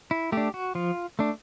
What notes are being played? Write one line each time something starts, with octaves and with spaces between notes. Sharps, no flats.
E4
A3 D4 G4
F#4
F3 F4
A3 D4